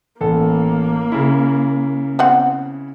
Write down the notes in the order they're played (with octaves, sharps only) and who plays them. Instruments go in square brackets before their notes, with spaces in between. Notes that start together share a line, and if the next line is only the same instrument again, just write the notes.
[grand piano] A1 A4 [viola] A#3
[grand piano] C#3 E4
[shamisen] B3 C4 F#5